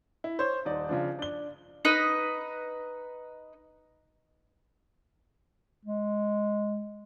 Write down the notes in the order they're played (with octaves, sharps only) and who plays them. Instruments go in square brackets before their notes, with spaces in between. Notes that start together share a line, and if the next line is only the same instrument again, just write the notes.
[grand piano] E4
C5 C#5 G6
D#1 D#4 D5
C#3 F3 D4
D4 G7
[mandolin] D#4 B4 D#5
[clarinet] G#3